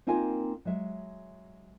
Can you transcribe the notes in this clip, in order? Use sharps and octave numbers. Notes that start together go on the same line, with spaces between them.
A#3 C4 D#4 F4 A#4 G#5
F#3 G#3 E5